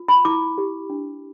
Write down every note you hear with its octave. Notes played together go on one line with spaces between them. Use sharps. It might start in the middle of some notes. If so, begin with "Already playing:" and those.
Already playing: F4
B5
E4 D6
G4
D4